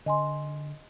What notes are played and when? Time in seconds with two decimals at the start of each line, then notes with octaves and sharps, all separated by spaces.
0.06 D3 D#5 G#5 C6